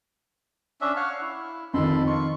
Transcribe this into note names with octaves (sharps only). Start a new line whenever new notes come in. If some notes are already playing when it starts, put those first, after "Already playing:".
C#4 D4 E5
C#5 F5 F#5
E4
F2 D#3 A4 B5 C6
F4 C#6